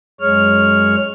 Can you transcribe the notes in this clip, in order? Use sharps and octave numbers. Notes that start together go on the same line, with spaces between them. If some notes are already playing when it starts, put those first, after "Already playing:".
F#2 G#3 C#5 F6